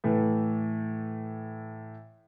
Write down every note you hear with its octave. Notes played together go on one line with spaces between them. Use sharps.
A2 E3 A3